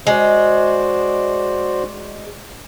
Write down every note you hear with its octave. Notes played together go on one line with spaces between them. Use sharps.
G#3 F#4 C5 D5